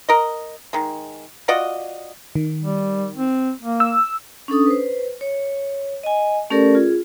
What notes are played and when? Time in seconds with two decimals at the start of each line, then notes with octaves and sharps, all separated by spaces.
0.09 A#4 D#5
0.73 D#3 G#3
1.48 F4 F#4 D5 D#5
2.35 D#3
2.62 G3
3.16 C4
3.61 A#3
3.80 E6
4.48 C#4 D4 A4 D#6
4.66 B4 C5
5.21 C#5
6.03 D#5 G#5
6.50 A3 C#4 G4 A4 A#4 D5
6.75 F4 G#4